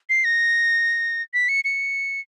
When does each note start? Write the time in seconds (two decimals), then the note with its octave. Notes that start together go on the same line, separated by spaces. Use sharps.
0.10 C7
0.24 A#6
1.34 B6
1.49 C#7
1.65 C#7